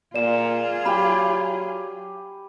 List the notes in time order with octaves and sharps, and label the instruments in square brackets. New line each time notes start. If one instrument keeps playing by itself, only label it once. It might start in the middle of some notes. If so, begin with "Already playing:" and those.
[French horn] A#2 [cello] F4 G#4 [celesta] D5 E7
[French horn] F#3 [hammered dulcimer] G4 G#5 B5